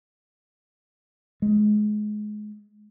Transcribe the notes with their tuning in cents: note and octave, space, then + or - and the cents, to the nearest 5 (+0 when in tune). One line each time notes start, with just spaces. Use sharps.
G#3 +25